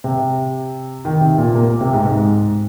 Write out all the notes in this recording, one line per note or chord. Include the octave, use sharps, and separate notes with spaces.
C3
D#3
C3
A#2
A#3
C3
G#2
G#2